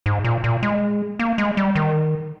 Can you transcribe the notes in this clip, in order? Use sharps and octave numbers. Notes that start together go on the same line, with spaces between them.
G#2
A#2
A#2
G#3
A#3
G#3
G3
D#3